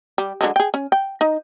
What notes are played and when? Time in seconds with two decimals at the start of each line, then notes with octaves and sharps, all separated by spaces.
0.18 G3
0.41 D3 F#3 G#3
0.56 G#4 G5
0.74 C#4
0.92 G5
1.21 D#4